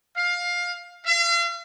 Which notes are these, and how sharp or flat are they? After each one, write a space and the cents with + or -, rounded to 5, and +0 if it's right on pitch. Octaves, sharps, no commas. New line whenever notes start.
F5 +20
F5 -40